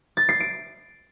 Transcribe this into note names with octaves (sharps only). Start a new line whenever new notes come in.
A6
C7
D7